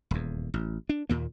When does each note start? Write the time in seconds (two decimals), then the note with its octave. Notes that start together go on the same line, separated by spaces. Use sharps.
0.11 D#1 E2
0.54 A1
0.89 D4
1.09 D#2 A#2 A#3